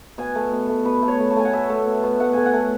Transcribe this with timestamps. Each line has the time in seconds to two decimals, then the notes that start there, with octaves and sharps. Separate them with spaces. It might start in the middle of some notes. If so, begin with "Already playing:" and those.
0.18 B2 G#5
0.35 A3
0.52 B2
0.69 A3
0.85 B2 B4
1.02 A3
1.08 C#5
1.20 A3
1.30 A5
1.36 A3 G#5
1.45 F#5
1.52 B2 E5
1.69 A3
1.86 B2
2.03 B2
2.20 A3 F#5
2.33 A3 G#5
2.45 F#5
2.53 A3